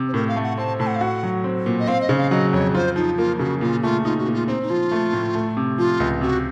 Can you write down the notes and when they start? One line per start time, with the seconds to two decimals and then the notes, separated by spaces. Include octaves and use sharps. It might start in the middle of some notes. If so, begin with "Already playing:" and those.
Already playing: C3
0.08 C5
0.14 A2 A#4
0.28 F5
0.36 A3
0.43 F#5
0.58 C4 A5
0.79 A2 A5
0.87 F#5
0.95 F5
1.01 F#4 F#5
1.23 F#3
1.44 C4
1.66 A#2
1.79 D#5
1.87 C4 F5
2.02 D#5
2.09 C#3
2.17 F5
2.31 F#3 D#5
2.53 F2 C#5
2.75 F4 C5
2.96 F3 D#4
3.18 A#3 F4
3.39 C#3 F#4
3.61 A#2 F4
3.83 A3 F4
4.04 D#4 F4
4.18 F#4
4.26 A#2
4.33 F4
4.47 C4 D#4
4.62 D#4
4.70 F3 F4
4.92 A3
5.13 A2
5.35 A3
5.57 C3
5.78 F3 F4
6.00 C#2
6.21 C3 F#4